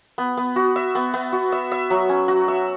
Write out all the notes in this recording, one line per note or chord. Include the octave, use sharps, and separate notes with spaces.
B3
B3
F#4
E5
B3
B3
F#4
E5
E5
F#3
C#4
F#4
E5